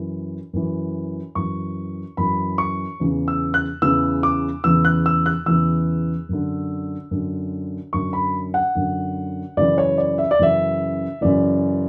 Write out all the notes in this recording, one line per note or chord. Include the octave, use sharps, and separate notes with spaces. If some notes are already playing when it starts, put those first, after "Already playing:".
Already playing: F#2 E3
F#2 E3
F#2 E3 C#6
F#2 E3 B5
C#6
E2 C#3 E3
E6
F#6
E2 C#3 E3 E6
D6
E2 C#3 E3 E6
F#6
E6
F#6
E2 C#3 E3 E6
F#2 D3
F#2 D3
F#2 D3 C#6
B5
F#5
F#2 D3
F#2 C#3 E3 D5
C#5
D5
E5
D5
F#2 C#3 E3 E5
F#2 C#3 E3 D5